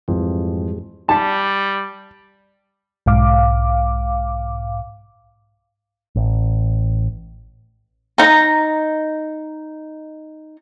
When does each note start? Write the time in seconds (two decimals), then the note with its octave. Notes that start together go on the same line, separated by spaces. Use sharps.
0.08 F2 G#2 E3 G3 G#3
1.09 G3 A5
3.06 B1 G#2 F5 D6
6.16 A1
8.18 D#4 A#5